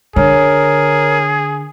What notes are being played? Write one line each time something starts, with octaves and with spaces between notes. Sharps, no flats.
D3 G#4 A#4 C#5